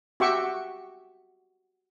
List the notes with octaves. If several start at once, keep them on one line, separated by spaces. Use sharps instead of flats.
F#4 G4 E5 G5 C#6 D6